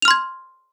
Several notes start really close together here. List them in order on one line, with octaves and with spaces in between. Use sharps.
F7 F6 C6 G#6